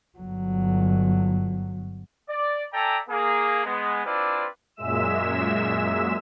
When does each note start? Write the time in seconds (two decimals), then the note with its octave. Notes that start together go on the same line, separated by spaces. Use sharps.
0.18 G1 F#3
2.29 D5
2.73 A4 D5 E5 G5 G#5 A#5
3.09 A#3 G#4
3.65 G#3 B3
4.05 C4 D4 E4 F4 B4 D5
4.76 F#2 A#2 G#3 E5 E6 E7